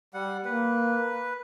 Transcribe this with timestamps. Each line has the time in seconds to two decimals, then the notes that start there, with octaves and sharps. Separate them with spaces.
0.14 G3 F#5
0.45 A#3 B4